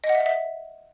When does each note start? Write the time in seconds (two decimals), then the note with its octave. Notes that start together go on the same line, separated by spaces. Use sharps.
0.04 D#5
0.09 F#5
0.15 E5
0.20 F#5
0.26 E5